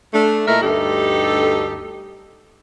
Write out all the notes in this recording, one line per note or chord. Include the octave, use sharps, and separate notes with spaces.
A3 D4
A#2 A3 E4 A#4 D#5 E5
D2 G2 D#4 G4 A4